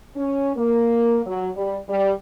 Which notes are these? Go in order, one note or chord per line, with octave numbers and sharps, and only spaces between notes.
C#4
A#3
F#3
G3
G3